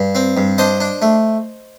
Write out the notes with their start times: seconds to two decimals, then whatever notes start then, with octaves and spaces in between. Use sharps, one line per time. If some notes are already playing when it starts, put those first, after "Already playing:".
Already playing: G2
0.15 C4
0.37 G2
0.58 D4 C5 D#5
0.80 D4
1.02 A3